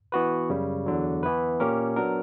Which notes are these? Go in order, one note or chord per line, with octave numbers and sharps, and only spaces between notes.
E3 B3 F#4 B4
F#2 C#3 G3
E2 D3 F#3
E3 B3 E4 B4
A#2 A#3 C#4 G4 A#4
F#3 B3 D4 A#4